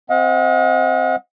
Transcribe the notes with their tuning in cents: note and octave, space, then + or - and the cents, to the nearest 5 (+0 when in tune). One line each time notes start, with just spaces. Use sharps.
C4 +0 D#5 +35 F#5 -45